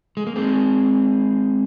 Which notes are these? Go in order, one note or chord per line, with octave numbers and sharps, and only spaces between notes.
G#3
A#3
G#3 C4